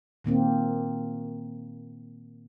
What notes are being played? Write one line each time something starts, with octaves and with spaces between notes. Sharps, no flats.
A#2 D#3 A#3 C4